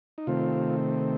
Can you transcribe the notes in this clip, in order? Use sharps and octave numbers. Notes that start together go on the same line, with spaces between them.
D#4
C3 D#3 A3 C4 F4